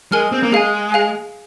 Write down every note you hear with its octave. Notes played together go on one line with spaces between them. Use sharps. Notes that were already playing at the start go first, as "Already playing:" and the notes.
G#3 A#4 G#5 F6
C4
A#3
G#3 G#4 F5 G#5
G#4 F5 G#5